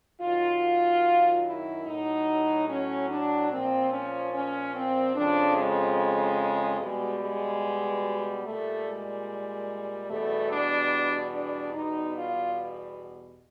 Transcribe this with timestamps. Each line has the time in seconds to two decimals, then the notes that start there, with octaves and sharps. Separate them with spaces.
0.21 F#2 D#3 F#3 F4
1.45 E4
1.86 A2 F#3 D#4
2.68 C#4
3.09 D4
3.51 A#2 F3 C4
3.92 C#4
4.33 C#4
4.74 C4
5.15 F2 C#3 F3 D4
5.56 G#3
6.80 B2 G3 G#3
7.21 G#3
8.45 A#2 G3 A3
8.85 G#3
10.09 E2 B2 G3 A3
10.50 D4
11.32 D4
11.73 E2 B2 G3 D#4
12.15 F4